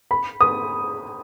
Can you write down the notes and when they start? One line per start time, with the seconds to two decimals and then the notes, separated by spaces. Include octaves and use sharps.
0.11 B5
0.41 D#6